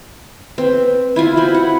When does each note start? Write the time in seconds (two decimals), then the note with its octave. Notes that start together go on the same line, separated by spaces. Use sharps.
0.58 C4 B4
1.16 E4 F4 G#5 B5
1.37 C4 F#4
1.54 F#5